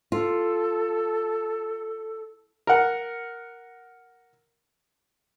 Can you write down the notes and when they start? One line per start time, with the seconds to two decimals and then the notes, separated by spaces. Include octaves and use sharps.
0.12 F4 A4
2.67 A#4 F#5